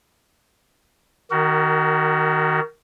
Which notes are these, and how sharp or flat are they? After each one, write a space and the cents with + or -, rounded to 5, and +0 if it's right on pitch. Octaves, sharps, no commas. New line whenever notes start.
D#3 +0 F#4 +25 A#4 -20